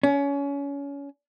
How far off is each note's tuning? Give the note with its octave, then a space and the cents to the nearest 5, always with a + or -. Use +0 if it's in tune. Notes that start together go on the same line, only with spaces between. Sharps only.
C#4 +25